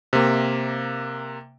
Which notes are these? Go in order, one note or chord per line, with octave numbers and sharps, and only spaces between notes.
C3 A#3